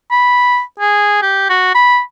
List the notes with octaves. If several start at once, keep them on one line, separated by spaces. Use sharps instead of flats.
B5
G#4
G4
F#4
B5